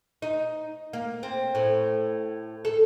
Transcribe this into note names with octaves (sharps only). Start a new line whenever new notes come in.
D#4
A#3
C4
A2
A4